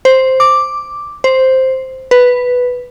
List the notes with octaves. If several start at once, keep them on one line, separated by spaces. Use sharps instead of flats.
C5
D6
C5
B4